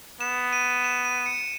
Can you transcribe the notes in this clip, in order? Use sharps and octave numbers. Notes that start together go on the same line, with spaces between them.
B3 E7
D#7
E7
D#7
D#7
C#7